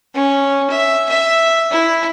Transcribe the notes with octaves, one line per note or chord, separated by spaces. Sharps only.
C#4
E5
E5
E4